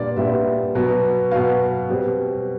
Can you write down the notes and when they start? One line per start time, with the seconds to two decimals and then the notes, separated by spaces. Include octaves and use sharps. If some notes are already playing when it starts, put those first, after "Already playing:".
Already playing: A#2 G3 B3 D4 D5
0.16 A#2 G3 B3 D4 E5
0.75 B2 F#3 B3
1.31 B2 F#3 B3 F5
1.89 B2 G3 C4